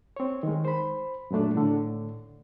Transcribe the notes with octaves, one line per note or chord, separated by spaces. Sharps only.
C4 C#5
D#3 G#3
C5 B5
F#2 A#2 F#3 A3 D4
A2 D3